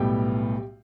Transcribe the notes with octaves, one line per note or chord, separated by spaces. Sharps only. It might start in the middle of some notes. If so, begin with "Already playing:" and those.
Already playing: B1 A2 G3 B3 G4 G5